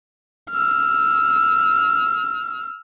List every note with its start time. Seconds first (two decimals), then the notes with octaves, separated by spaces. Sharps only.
0.51 E6 F6